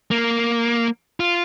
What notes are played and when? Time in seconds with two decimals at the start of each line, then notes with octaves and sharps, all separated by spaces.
0.11 A#3
1.20 F4